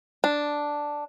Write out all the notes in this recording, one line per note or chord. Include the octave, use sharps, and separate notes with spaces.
D4